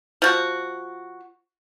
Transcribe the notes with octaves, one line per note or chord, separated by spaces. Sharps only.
F3 F#4